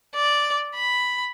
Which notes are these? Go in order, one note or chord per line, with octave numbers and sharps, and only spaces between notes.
D5
B5